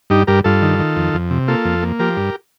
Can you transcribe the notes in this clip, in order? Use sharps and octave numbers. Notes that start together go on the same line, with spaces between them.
G2 D#4 G4
G2 G4 A#4
G2 F4 A4
D#3
D#3
F2
F2
C3
A#3 F4 A4
F2
A#3
F3 G4 A#4
G2